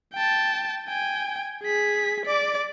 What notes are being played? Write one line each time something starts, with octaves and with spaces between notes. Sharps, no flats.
G5 A5
G5 G#5
G#4 B6
D5 D6